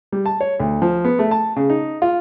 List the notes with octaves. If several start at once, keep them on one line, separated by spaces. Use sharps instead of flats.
G3
A5
C#5
D2
F3
B3
A3
A5
C#3
D#4
F4